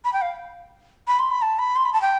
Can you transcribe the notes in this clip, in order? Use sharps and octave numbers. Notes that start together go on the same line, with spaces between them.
B5
G5
F5
B5
C6
B5
A5
B5
C6
B5
A5
G5